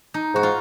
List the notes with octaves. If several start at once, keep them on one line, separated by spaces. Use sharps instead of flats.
D#4
G#2 F#4
F4